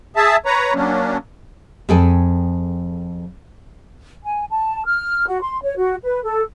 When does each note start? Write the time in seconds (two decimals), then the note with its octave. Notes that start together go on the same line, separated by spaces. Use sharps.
0.16 G#4 E5 A5
0.46 B4 C#5 A#5
0.74 F#3 A#3 C#4 D4
1.89 F2 G#4 A4 G5 G#5
4.24 G#5
4.50 A5
4.85 F6
5.27 F#4
5.42 C6
5.64 C#5
5.77 F#4
6.04 B4
6.24 A4